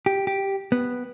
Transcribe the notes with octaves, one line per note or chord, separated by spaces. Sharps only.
G4
G4
B3